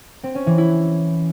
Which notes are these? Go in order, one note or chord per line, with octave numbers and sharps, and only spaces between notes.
C4
C#4
E3
E4